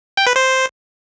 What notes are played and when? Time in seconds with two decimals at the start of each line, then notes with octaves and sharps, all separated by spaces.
0.17 G5
0.27 B4
0.36 C5